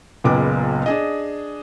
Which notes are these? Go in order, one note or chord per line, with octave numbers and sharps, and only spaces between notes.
F#1 C#2 A#2 B3 D6
D4 G#4 D#5